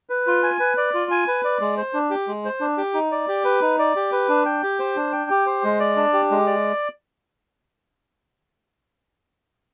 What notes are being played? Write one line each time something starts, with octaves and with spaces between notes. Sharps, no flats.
B4
F4
G#5
B4
D5
F4
G#5
B4
D5
G#3
C5
D4
G4
G#3
C5
D4
G4
D#4
D5
G4
B4
D#4
D5
G4
B4
D4
G5
G4
C5
D4
G5
G4
C5
G#3
D5
D4
G4
G#3
D5